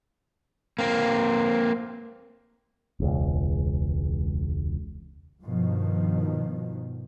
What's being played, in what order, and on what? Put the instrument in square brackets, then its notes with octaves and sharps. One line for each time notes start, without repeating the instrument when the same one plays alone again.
[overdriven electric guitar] A#3 C4
[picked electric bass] E1 C#2
[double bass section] G2 B2 D#3 F3